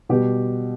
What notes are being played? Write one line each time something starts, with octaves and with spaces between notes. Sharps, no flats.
B2 G3 B3 G4